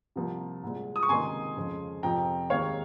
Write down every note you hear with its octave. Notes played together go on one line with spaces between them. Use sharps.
C2 C3 F3 A#3
C2 A#2 G#3
D#6
C#6
C#2 C3 D#3 A#3 D#4 G#5 C6
F2 C#3 F3 G#3
F2 C3 F3 G5 A#5
D#2 D#3 G#3 C4 C#5 F5